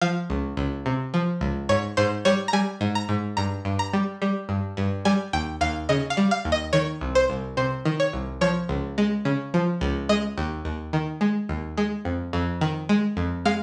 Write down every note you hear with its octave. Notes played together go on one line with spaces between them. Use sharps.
F3 F5
C#2
C#2
C3
F3
C#2
G#2 C#5
G#2 C5
G3 C#5
A#5
G3 G#5
G#2
A#5
G#2
G2 A#5
G2
A#5
G3
G3
G2
G2
G3 G#5
D#2 G5
D#2 F5
C#3 D#5
F5
G3
F5
D#2
D#5
D#3 C#5
C2
C5
C2
C3 C5
D#3
C#5
C2
F3 C#5
C#2
G#3
C#3
F3
C#2
G#3 D#5
D#2
D#2
D#3
G#3
D#2
G#3
F2
F2
D#3
G#3
F2
G#3 F5